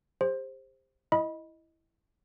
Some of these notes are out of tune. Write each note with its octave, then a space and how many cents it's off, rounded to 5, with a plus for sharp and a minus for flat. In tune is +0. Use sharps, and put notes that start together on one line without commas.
G4 +40 C5 +10
E4 +0 D#5 +10 B5 -20